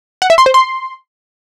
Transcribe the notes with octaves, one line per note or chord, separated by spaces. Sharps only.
F#5
E5
C6
C5
C6